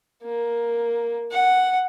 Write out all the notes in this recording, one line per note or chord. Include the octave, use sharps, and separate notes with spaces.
A#3
F#5